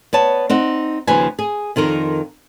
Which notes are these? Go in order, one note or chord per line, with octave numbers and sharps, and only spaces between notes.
B3 C#5 A5
C4 D#4 F#5
D#2 C#3 F3 B4 G#5
G#4
F2 D#3 F4 A#4